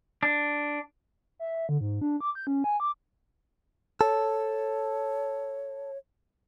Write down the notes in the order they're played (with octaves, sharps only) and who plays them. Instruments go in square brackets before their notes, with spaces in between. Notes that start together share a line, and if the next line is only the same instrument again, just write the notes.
[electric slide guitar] D4
[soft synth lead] E5
E5
D3
G#2
D4
D6
G6
C#4
G#5
D6
[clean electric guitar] A4 [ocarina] C#5